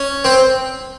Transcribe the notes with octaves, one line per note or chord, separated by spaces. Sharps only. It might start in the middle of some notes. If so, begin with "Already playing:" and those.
Already playing: C#4
C4